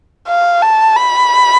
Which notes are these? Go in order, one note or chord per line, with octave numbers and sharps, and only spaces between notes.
F5
A5
B5